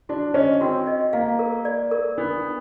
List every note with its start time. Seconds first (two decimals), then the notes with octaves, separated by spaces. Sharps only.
0.09 D4 F#4
0.34 C#4 D#5
0.61 C4 F#4
0.87 D#5
1.13 A#3 F5
1.39 A#4
1.65 D5
1.91 A#4
2.18 B3 D4
2.43 D4